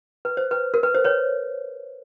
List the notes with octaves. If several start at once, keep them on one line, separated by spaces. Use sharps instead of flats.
B4
C5
B4
A#4
B4
C5
B4 C#5